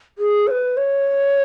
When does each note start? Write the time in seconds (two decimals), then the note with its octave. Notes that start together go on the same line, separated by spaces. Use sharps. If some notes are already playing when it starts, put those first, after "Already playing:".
0.18 G#4
0.47 C#5
0.51 B4
0.77 C#5